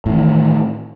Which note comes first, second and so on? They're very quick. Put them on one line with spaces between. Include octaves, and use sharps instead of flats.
A2 E3 D#3